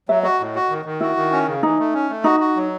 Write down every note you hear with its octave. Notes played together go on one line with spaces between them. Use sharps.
F#3 E5
F#4 D#5
A2
F#4
D#3
D#3
E4 F#4
D#3
C#4
C#3
E3 D#4
A3
C#4
A3
D#4 F#4
F#4
F#3